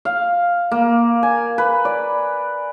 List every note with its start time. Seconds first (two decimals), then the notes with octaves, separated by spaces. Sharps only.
0.05 F5
0.72 A#3
1.23 G#5
1.58 B4
1.85 D5